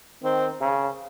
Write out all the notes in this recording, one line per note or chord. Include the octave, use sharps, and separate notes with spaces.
D#3 C4
C#3